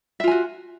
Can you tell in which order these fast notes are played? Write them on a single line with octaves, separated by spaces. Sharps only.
E5 F4 G#5 F#4